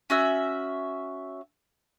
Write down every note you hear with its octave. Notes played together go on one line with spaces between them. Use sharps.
C#4 F#4 E5